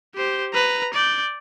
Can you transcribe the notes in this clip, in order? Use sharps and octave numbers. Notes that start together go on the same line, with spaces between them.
G4 C5
B4 A#5
D5 G6